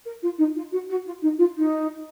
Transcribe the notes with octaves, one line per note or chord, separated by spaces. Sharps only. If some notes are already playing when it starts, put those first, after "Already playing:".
A#4
F4
D#4
F4
F#4
F#4
F4
D#4
F4
D#4